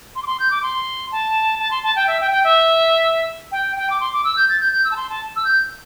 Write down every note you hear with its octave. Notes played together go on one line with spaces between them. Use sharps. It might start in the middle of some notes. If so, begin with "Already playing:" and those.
C6
D6
C6
G6
D6
C6
A5
A5
C6
A5
G5
E5
G5
G5
E5
G5
G5
D6
C6
D6
E6
G6
A6
G6
G6
E6
A5
C6
A5
E6
G6